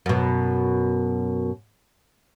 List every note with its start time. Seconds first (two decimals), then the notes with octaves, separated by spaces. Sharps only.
0.06 F#2 B2